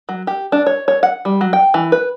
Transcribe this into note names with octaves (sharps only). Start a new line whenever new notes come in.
F#3
G4
D4
C#5
C#5
F#5
G3
F#3
G5
E3
B4